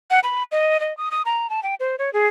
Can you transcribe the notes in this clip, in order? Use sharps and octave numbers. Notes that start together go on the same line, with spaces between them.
F#5
B5
D#5
D#5
D#6
D#6
A#5
A5
G5
C5
C#5
G#4